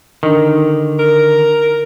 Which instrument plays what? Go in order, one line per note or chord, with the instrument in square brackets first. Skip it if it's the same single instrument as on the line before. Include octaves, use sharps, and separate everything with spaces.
[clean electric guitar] D3 [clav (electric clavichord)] D#3
[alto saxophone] A#4